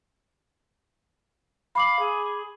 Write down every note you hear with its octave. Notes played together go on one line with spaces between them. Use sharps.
F5 B5 D6 F#7
G#4